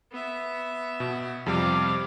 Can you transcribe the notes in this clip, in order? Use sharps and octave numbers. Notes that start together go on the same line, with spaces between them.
B3 E5
B2
F2 C3 G3 F5 D6